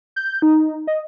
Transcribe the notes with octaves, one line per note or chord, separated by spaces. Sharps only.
G6
D#4
D#5